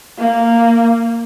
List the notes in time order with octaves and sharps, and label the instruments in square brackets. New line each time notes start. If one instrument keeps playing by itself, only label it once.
[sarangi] A#3